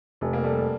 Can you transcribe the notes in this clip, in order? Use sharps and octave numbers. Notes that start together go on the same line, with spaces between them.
F1 A3
A#3
G3 A3